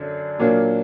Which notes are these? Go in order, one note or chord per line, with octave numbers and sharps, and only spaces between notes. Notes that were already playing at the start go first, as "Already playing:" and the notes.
Already playing: F#2 D3 F#3 D4
A#2 F#3 A#3 D4